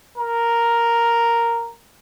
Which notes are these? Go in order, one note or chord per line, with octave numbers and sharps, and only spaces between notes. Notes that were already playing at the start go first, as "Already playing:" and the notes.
A#4